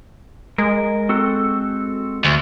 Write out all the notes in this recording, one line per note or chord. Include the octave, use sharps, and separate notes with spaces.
G#3 A#4
C4 F#4 A4
D2